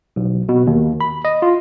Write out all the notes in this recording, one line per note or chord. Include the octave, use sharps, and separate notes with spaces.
B1
B2
D#2
B5
D#5
F4